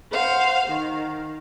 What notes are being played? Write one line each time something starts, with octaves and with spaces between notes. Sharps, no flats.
C5 F5 F#5
D#3